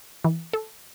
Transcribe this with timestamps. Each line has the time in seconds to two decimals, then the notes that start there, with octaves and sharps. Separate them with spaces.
0.24 E3
0.53 A4